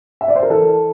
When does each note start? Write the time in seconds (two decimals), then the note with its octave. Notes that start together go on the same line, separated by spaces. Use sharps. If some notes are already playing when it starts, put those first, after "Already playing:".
0.21 E5
0.28 D5
0.35 C5
0.43 A#4
0.50 E3 A4